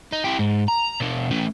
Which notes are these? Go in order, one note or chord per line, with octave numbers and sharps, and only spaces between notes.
D#4
E4 G4
G#2
A#5
B2 D4
A3 C#4